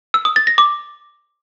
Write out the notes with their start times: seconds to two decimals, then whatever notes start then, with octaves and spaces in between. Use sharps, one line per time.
0.14 E6
0.25 D#6
0.36 A6
0.47 A#6
0.58 D6